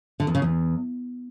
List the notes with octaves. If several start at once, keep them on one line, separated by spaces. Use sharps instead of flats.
D3
E2
C#3
E2